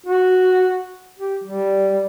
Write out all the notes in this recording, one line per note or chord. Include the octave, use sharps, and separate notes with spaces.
F#4
G4
G3